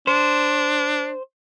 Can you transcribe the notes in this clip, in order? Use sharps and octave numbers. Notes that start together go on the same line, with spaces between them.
D4 C5